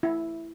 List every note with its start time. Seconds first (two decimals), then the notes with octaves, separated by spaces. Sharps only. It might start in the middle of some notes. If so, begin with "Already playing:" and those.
0.03 E4